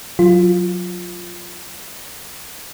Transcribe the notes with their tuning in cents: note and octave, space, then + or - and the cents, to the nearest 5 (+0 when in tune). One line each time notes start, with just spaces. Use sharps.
F#3 -25 F4 +0